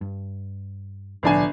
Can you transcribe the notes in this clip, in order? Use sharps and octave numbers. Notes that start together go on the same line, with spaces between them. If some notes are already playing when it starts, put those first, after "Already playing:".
G2
G1 C2 A2 F3 D4 G#5